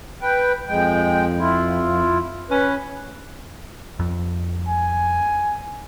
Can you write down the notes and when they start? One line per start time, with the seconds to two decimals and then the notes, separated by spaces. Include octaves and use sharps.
0.22 B4 G5
0.68 F2 G#3 G5
1.38 E4 F4
2.50 C#4 B4
3.99 F2
4.68 G#5